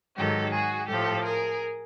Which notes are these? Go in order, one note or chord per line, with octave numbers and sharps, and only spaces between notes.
G#2 D#3 F#3 G4 A4
F#4 G#4
A2 F3 G4 A4
G#4 A#4